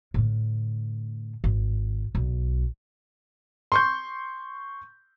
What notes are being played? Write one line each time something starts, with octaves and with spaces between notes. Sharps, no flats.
A2 D3
G#1
B1
C6 C#6 G6